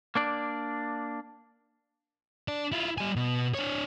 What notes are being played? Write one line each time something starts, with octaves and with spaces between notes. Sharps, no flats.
A#3 D4 D5
D4 D5
E4 F4
G3 G#5
B2
D4 C#5